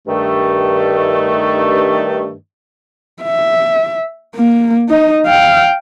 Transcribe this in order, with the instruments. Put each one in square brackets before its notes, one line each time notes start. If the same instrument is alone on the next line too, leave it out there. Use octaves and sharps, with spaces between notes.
[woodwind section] G2 D#3 A3
[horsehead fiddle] E5
A#3
D#4 D#5
F5 G5